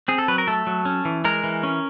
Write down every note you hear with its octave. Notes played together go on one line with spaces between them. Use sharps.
C4 G#4
A4
F#3 B4
A#4
A3 A4
F#3
C#4
E3
G#3 A#4
E3
C#4